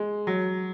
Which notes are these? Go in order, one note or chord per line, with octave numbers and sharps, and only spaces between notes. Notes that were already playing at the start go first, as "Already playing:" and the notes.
Already playing: G#3
F#3